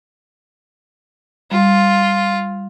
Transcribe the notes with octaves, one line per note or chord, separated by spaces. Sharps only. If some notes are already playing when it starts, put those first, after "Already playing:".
G3 F4